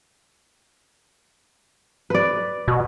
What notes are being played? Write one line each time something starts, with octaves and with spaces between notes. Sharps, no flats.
B4 D5
B2